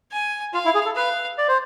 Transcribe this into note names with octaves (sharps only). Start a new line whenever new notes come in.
G#5
F4 F5
E4
G#4
A4
B4 F5
D5
C5